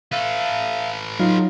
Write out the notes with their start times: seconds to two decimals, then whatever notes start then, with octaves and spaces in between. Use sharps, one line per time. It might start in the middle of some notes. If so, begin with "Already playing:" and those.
0.12 A4 B4 E5 F5
1.19 F#3 D#4 F4 C6 F6